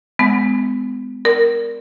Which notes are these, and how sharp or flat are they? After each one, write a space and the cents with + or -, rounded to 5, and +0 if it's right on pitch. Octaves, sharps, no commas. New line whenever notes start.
G#3 +0 B3 +40
A#4 +0 D5 +0